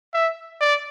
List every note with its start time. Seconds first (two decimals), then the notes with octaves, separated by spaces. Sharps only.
0.14 E5
0.61 D5